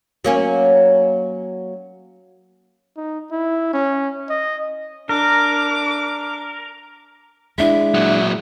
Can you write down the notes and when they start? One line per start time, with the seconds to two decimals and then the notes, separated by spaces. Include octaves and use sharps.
0.24 F#3 A#3 C#4
2.97 D#4
3.32 E4
3.73 C#4
4.30 D#5
5.09 D4 A#4 D6
7.58 G#3 D4 E4 E5
7.94 A#2 F#3